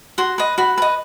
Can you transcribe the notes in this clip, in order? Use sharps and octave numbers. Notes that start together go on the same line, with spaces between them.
F#4 C6
B4 D#5
F#4 B5
B4 D#5